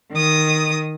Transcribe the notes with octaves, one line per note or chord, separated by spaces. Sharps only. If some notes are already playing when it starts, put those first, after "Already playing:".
D#3 D#6